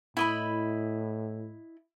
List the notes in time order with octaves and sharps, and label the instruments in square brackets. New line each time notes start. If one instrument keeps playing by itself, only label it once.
[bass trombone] A2 [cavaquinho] E4 D#5 B5